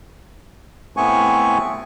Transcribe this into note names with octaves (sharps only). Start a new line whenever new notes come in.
A2 A3 B3 C4 G#5 C#6